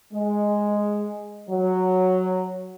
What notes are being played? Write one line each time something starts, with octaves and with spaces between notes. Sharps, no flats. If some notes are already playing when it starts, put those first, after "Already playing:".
G#3
F#3